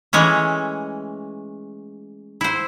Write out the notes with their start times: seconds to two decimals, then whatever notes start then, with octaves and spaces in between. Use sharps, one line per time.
0.13 E3 G#3 A3 C#4
2.41 E4 C5